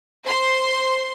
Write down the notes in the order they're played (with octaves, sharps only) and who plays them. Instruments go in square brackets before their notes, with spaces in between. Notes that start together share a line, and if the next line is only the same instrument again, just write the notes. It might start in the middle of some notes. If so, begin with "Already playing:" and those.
[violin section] C5 C6